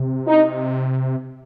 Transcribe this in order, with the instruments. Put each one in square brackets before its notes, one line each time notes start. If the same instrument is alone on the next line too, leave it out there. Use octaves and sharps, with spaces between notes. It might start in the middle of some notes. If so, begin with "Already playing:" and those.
Already playing: [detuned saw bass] C3
[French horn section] D#4